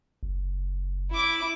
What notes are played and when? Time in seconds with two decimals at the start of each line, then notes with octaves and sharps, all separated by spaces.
0.23 F#1
1.11 E4 D6